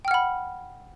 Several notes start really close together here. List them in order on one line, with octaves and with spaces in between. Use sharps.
G5 F6 F#5 B5